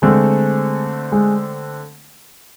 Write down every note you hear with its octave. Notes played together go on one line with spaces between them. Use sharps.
D3 G#3 A3 C4
G#3